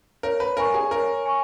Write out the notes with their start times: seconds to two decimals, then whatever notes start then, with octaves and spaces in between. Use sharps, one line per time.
0.23 A#4 C#5
0.40 B4
0.57 A#4 G#5 C#6
0.74 G#4
0.91 A#4 C#5
1.26 G#5 C#6